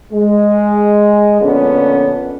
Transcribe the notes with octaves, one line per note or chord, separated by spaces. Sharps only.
G#3
F2 A#2 D3 B3 C#4